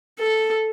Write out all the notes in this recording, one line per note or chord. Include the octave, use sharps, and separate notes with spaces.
A4